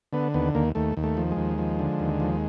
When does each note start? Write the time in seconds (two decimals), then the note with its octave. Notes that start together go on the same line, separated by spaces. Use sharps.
0.13 D3 B3
0.34 D#2 B3
0.55 D#2 A#3
0.75 D#2 A3
0.97 D#2
1.03 A3
1.17 F3
1.31 G#3
1.37 D#2
1.58 F3
1.79 D3
2.00 D#2
2.20 F3